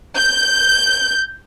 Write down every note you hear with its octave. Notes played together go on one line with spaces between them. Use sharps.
G6